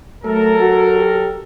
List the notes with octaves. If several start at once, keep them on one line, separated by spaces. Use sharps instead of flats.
F#3 A3 A4 A#4
F#4
G4